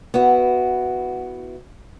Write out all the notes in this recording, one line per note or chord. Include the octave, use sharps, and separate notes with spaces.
B3 E4 F#4